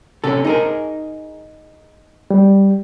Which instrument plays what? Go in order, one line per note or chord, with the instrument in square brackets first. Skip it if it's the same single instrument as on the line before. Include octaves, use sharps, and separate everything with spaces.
[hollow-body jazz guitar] C3 C#4 A4
D#4 G#4 A#4
[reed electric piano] G3